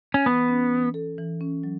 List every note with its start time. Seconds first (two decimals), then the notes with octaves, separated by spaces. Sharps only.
0.14 C#4
0.26 E3 B3
0.48 C#4
0.71 E3
0.94 A4
1.18 E3
1.41 C#4
1.63 F#3